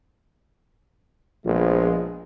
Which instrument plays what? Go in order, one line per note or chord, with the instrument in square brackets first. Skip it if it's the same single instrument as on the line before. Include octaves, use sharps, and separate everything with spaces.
[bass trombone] A#1 [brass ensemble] F3 G#3 B3